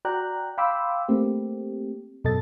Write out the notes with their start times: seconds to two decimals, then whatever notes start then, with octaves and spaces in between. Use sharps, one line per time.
0.05 F#4 D5 G5 A#5 F#6
0.58 F5 G5 B5 C6 D6 E6
1.09 A3 A#3 C4 G4
2.24 F#2 B2 A4 D#5 A6